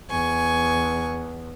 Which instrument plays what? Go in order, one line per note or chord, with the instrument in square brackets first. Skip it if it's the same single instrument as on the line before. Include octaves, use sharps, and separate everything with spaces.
[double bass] E2 [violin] G#5 C#6